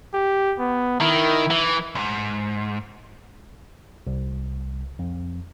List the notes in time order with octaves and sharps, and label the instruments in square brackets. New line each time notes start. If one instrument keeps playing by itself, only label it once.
[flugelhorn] G4
B3
[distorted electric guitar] D#3 [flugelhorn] E4
[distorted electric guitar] E3
[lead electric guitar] C2 G#2
[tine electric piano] C2
F2